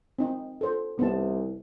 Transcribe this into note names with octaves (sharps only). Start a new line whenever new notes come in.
C4 D#4
A4 C5
C2 B3 D#4 A5